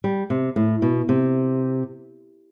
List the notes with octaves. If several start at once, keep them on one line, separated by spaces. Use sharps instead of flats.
G3
C3
A2
B2
C3